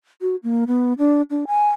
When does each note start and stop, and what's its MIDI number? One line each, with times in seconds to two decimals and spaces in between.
0.22 0.36 66
0.43 0.64 58
0.67 0.93 59
0.98 1.22 62
1.30 1.44 62
1.47 1.70 80